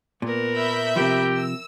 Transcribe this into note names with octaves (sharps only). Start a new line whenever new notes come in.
A#2 B3 A#4
E5 B5 G6
C3 F3 G4 A#4
E6